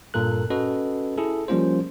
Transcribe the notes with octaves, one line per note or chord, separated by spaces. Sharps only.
G2 A#2 A4 A#4 F#6
C#4 F#4 A4 B4 D#5
E4 G#4 A4
F3 G3 A#3 C#4 F4 C5